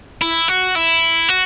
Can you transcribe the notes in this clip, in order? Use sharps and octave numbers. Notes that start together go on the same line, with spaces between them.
E4
F#4
E4
F#4